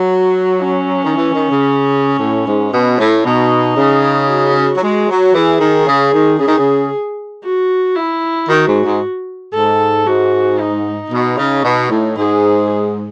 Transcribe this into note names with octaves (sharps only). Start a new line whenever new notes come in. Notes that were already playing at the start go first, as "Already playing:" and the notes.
Already playing: F#3
F#4
C#4
D#3
E3
D#3
C#3
A2
G#2
B2
A2
B2 D#4
C#3
F#4
F#3
G#3
F#3
E3 G#4
D#3
C#3
D#3
C#3 G#4
D#3
C#3
F#4
E4
D#3 F#4
G#2
G#2
G#2 A4
G#2 F#4
D#4
B2
C#3
B2
A2
G#2 G#4